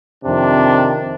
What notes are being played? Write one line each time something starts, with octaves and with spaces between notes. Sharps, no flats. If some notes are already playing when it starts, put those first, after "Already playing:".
F2 C3 D#3 D4